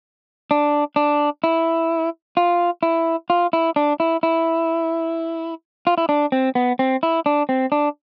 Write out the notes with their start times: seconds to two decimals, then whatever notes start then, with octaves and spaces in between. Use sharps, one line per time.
0.51 D4
0.96 D4
1.44 E4
2.37 F4
2.83 E4
3.30 F4
3.53 E4
3.76 D4
4.00 E4
4.23 E4
5.87 F4
5.98 E4
6.09 D4
6.32 C4
6.55 B3
6.79 C4
7.03 E4
7.26 D4
7.49 C4
7.72 D4